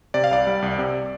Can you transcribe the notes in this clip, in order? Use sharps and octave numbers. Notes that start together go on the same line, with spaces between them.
C3 D5
F5
C2 D5
G3
C2
C3